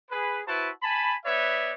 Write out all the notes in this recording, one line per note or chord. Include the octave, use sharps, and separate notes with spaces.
G#4 B4
E4 F#4 B4 C5 A5
G#5 A5 B5
B3 B4 C#5 D5 E5